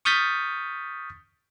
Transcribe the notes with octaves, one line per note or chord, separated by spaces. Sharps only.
C#6 D#6 F6 G6 A6 B6